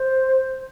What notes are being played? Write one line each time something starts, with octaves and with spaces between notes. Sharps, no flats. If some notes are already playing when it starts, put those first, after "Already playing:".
Already playing: C5